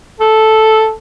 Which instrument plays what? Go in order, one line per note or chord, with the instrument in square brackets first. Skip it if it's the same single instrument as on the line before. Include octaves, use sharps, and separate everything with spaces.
[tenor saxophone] A4